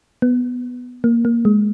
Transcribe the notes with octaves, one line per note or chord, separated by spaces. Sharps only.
B3
A#3
A#3
G#3